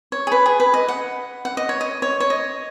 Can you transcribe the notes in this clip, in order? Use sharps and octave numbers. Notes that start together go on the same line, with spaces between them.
C#5
G#4
B4
G#4
B4
D#5
F#5
F#5
D#5
C#5
D#5
C#5
C#5
D#5